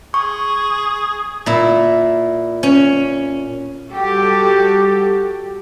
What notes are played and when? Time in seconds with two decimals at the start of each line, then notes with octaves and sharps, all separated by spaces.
0.14 G#4 C#6
1.46 A#2 E4
2.63 C#4
3.92 G3 F#4 G4 A4